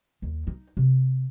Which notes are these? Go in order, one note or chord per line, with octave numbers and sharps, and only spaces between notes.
D#2
D#4
C3